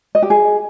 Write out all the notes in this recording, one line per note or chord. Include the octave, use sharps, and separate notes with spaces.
D#5
G4
G#4